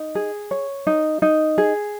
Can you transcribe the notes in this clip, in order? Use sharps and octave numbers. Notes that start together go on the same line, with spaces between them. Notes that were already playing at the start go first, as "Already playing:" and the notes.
Already playing: D#4
G#4
C#5
D#4
D#4
G#4